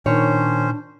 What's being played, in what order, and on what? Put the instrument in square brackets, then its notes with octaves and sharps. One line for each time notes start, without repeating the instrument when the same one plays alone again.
[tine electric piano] A#2 [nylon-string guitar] D#3 C#5 [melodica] C#4 C5 [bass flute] D4